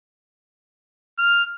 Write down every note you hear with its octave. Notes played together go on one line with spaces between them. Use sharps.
F6